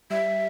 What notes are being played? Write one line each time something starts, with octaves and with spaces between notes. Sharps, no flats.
G3 E5